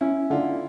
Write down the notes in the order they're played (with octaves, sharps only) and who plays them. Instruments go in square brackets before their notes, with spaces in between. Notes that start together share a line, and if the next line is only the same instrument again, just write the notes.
[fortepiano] C#4 [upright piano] E4
[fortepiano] D3 [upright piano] F4